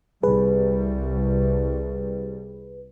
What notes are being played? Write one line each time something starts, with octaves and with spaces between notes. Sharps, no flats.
C2 G3 G#4 B4